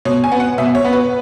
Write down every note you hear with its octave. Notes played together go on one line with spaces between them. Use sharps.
B2 C#5
G#5
B3
F#5
B2 E5
C#5
B3
B4